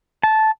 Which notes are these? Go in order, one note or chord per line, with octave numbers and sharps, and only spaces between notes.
A5